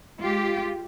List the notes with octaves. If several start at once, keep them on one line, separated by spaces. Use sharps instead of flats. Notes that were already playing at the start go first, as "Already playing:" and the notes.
G#3 F4 G4